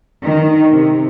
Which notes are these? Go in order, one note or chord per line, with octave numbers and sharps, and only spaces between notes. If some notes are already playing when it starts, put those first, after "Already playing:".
D#3
C3